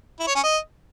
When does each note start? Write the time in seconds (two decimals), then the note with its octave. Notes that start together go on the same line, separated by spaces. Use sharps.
0.19 E4
0.27 C#5
0.35 C#4
0.43 D#5